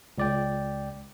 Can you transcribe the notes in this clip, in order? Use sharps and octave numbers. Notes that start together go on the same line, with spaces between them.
C#2 D5 G5